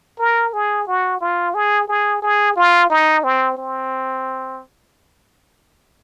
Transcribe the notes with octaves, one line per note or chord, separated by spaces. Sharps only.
A#4
G#4
F#4
F4
G#4
G#4
G#4
F4
D#4
C4
C4